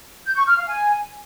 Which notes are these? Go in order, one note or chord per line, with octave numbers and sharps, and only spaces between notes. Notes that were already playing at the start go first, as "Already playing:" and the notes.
G6
C#6
F6
F5
G#5